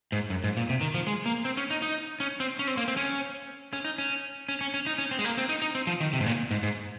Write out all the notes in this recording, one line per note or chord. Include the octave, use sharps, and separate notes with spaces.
G#2
F#2
G#2
A#2
C3
D#3
F3
G#3
A#3
C4
C#4
D#4
D#4
C#4
C4
C#4
C4
A#3
C4
C#4
C#4
D#4
C#4
C#4
C#4
C#4
D#4
C#4
C4
G#3
A#3
C4
D#4
D#4
C4
F3
D#3
C3
G#2
A#2
G#2
G#2